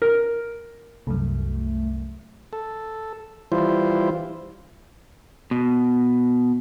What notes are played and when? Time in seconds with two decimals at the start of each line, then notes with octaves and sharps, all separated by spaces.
0.02 A#4
1.07 C2 F#2 A3
2.53 A4
3.52 E3 G3 E4 F4 C5
5.51 B2